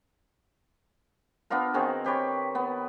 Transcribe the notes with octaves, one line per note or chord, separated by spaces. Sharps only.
B3 D4 F4 A#4
D#3 C4 F#4 G#4
C4 G4 B4 C#5
B3